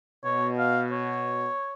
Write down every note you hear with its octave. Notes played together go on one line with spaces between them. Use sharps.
B2 C#5
F5
C#5